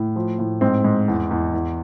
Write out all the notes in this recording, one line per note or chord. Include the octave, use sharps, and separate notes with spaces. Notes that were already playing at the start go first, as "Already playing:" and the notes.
Already playing: A2
F3
A2
G#2 C4
G#2
E2
E2
E2